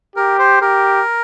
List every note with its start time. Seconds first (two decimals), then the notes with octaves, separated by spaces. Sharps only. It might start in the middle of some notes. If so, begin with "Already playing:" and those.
0.16 G4 A#4
0.39 C5
0.61 G4 A#4